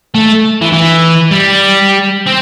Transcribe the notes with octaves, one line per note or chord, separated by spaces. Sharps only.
A3
E3
E3
G3
C4